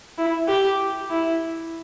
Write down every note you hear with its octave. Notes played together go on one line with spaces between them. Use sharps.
E4
G4
E4